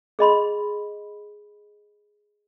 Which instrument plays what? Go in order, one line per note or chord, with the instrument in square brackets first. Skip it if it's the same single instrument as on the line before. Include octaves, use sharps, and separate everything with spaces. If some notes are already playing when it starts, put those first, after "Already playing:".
[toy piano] G#4 D#5 B5 C6